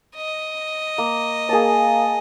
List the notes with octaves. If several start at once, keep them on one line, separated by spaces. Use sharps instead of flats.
D#5
A#3
A#3 G#4 A5